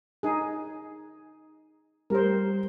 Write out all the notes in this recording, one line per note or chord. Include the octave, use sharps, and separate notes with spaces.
D#4 G#4
G3 A#4 C5